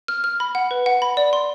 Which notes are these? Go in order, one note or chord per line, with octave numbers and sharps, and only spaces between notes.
F6
F6
B5
F#5
B4
F#5
B5
D5
C6